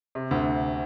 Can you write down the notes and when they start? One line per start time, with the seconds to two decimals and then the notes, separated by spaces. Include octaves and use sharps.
0.15 C3
0.31 D2 D3